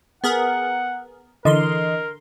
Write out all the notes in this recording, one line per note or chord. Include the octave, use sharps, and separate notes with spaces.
B3 G#4 A#4 F#5
D3 E3 A#4 D#5 C6